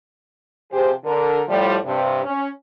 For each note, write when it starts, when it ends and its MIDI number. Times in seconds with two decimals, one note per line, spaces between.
0.72 0.92 48
0.72 0.92 53
0.72 0.92 67
0.72 0.92 68
0.72 0.92 72
1.05 1.42 50
1.05 1.42 70
1.48 1.77 45
1.48 1.77 53
1.48 1.77 55
1.85 2.22 43
1.85 2.22 48
2.24 2.48 61